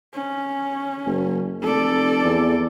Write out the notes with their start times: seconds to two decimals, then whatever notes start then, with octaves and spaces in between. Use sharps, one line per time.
0.14 C#4
1.06 F#1
1.62 F1 A4 D5
2.24 E2